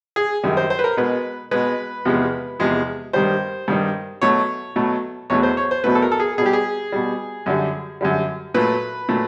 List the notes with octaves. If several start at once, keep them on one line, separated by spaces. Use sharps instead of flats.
G#4
F#2 D#3 G3
C5
C5
B4
A#4
B2 G#3 B4
B2 G#3 B4
E2 C3 F3 G#3
E2 C3 F3 G#3
G2 D#3 G3 C5
G2 D#3 G3
B2 F#3 A3 C#5
B2 F#3 A3
E2 B2 F#3 A3 C#5
C5
C#5
C5
E2 B2 F#3 A3 B4
A4
A#4
A4
G#4
B2 G3 G4 G#4
G#4
B2 G3
F#2 D3 G3
F#2 D3 G3
A#2 F#3 A3 B4
A#2 F#3 A3